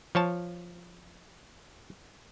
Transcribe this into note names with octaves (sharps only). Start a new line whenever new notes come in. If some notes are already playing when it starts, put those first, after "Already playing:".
F3 C#5 A5